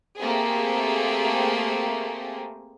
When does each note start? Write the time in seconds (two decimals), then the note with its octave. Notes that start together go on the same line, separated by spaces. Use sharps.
0.18 A3 A#3 C4 G4 G#4